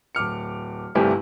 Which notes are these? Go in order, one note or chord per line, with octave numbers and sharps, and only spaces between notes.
D1 D6 F6 C#7
G1 C2 C3 A3 G4 G#5